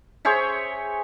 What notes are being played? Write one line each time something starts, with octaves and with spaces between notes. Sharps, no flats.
G#4 C5 C#5 E5